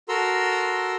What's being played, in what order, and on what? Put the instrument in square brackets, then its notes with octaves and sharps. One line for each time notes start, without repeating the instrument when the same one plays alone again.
[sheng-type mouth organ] F#4 A4 A#4 A#5 C6 E6